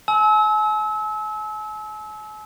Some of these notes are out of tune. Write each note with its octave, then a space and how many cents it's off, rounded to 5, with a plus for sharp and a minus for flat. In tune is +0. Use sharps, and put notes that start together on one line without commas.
G#5 +45 E6 -30